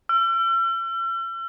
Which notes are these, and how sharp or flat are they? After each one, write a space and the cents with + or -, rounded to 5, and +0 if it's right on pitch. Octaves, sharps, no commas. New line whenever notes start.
E6 +45